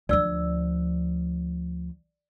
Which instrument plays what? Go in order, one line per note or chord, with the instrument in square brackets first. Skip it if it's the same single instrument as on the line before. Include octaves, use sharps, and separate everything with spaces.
[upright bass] D2 F3 [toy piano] D5 E6